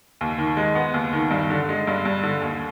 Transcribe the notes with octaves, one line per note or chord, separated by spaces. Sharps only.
D#2
D#3
G#3
B3
D#2
D#3
G2
D3
G#3
G2
G2
D3
D#2